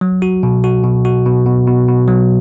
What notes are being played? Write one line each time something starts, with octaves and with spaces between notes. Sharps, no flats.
F#3
F#4
B2
F#4
B2
F#4
B2
B2
B2
B2
F#3